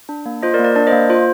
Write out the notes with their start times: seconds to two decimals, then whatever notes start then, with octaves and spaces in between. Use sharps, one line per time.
0.09 D4
0.26 A#3
0.43 F4 C5 D#5
0.54 A#4 D5
0.59 A#3
0.64 A#4 D5
0.75 D4 A#4 D5
0.87 C5 D#5
0.92 A#3
1.09 F4 C5